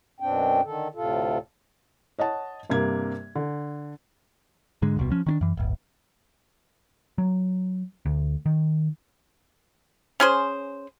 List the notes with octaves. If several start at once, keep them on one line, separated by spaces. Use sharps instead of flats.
F#2 B2 C4 D4 G5
D3 D#3 A4
D2 A2 C3 F4 A4
C#5 D#5 F#5 A5
G2 C3 A#3 G#6
D3
G#2 D3 G#3
D#1 C2 B2
F3 C#4
D#3 C#4 D4
F#2 E3
D1 G1
F#3
D2
D#3
C#4 G#4 C5